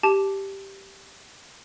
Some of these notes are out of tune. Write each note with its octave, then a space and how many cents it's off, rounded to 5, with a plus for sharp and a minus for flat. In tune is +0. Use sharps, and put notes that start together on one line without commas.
G4 -5 A5 -15